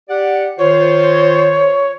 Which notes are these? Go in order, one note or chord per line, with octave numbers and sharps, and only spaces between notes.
G4 D5 F#5
D#3 F4 C5 C#5